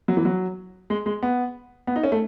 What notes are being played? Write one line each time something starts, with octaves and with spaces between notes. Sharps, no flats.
F#3
E3
F#3
G#3
G#3
B3
B3
D#4
C#4
A3